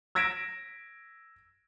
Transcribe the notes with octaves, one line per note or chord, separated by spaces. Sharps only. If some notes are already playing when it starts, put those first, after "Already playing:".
E6 G#6 A#6 B6 D7 E7